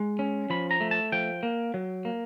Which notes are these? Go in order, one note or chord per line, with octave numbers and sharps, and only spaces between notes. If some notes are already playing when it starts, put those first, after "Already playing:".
Already playing: G#3
C#4
F3 B5
A#5
A3
A5
F3 G5
A#3
F#3
A#3